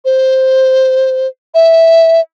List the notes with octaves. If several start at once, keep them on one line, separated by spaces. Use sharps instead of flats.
C5
E5